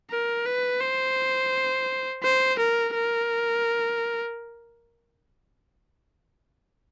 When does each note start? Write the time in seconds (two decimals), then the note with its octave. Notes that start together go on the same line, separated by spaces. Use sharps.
0.11 A#4
0.46 B4
0.81 C5
2.23 C5
2.59 A#4
2.94 A#4